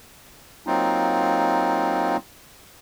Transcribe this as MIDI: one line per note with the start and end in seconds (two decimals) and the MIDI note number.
0.67 2.17 54
0.67 2.17 58
0.67 2.17 60
0.67 2.17 63
0.67 2.17 65